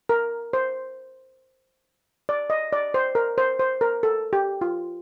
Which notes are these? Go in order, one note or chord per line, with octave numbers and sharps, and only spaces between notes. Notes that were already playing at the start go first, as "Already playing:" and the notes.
A#4
C5
D5
D#5
D5
C5
A#4
C5
C5
A#4
A4
G4
F4